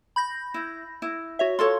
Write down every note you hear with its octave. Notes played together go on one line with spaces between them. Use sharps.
B5 G6 A#6
E4
E4
F#4 C#5 E5
F4 A4 C#5 C6